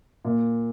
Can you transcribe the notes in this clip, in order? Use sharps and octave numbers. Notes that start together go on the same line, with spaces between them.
A#2